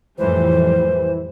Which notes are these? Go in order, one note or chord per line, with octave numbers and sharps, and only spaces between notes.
F2 A2 E3 G3 C5